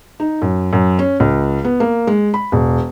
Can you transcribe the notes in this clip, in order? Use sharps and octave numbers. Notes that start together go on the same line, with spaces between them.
D#4
F#2
F#2
C#4
C#2
B3
A#3
G#3
B5
E1